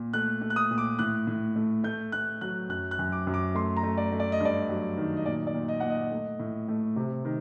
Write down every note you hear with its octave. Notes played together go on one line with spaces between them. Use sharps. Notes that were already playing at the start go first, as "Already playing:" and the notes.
Already playing: A#2
A3 F#6
A3
F#6
D#6
A#2
D6
A2 F#6
A2
A3
A3 G6
A3 F#6
F#3 F#6
F#2 F#6
F#6
F#2
D6
F#2
D6
A3 C6
A#5
A3
D5
A3
D5
D#5
G2
D5
F#3
D#3
D#5
A#2 D5
D5
A#2
D#5
A#2 F#5
D#5
A3
A2
A3
C3
D#3